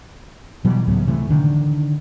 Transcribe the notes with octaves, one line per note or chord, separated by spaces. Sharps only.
B2 E3 F#3 G3
C#2 A2 F#3 B3
C3 E3 A3
D3 D#3 D4